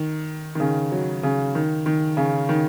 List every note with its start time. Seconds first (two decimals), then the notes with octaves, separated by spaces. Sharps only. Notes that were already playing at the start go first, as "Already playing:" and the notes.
Already playing: D#3
0.55 D#3
0.60 C#3
0.92 F#3
1.23 C#3
1.55 D#3
1.86 D#3
2.17 C#3
2.49 D#3